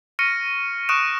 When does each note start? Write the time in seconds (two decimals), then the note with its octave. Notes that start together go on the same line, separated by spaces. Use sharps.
0.19 C#6 F6 A#6 C#7 D#7
0.89 C#6 D#6 F#6 D7 E7